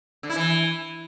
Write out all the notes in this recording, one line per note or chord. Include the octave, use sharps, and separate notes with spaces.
D3
E4
E3